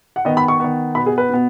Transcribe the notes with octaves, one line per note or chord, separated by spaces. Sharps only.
F#5
D#3 B3 D#5
B5
C#6
D#3 B3
B2 B3 B5
G#4
B4
B2 B3